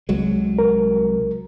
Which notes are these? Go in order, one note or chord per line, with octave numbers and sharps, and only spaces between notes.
C2 F#3 G#3
A#4